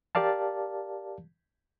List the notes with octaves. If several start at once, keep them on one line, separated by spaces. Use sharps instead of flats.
G4 A#4 D5 F5 A5